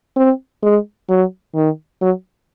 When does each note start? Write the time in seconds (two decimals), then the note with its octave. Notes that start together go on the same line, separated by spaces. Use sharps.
0.16 C4
0.63 G#3
1.09 F#3
1.55 D#3
2.02 F#3